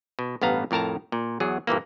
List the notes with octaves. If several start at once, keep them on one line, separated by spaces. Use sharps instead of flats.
B2
A1 G2 B3 F5 A#5
F2 A2 A#4 A5 A#5
A#2
E2 F#3 G#4
G2 A#2 E3 A#3